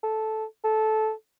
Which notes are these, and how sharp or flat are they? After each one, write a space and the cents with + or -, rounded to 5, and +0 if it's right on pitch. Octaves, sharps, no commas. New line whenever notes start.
A4 -10
A4 -15